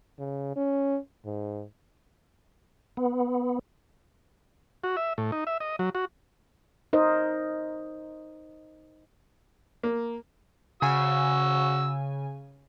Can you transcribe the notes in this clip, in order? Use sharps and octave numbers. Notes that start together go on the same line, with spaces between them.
C#3
C#4
G#2
B3
F#4
E5
A2
D#4
E5
D#5
F#3
F#4
D#4 A#4 C5 D#5
A#3
C#3 F#4 G#5 E6